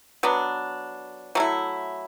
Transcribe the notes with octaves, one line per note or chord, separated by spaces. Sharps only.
F#3 B3 D4
F#3 A3 E4